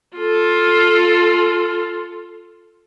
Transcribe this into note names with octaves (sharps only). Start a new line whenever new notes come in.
F4 A4